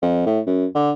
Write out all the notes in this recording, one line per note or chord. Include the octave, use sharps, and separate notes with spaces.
F2
A2
F#2
D3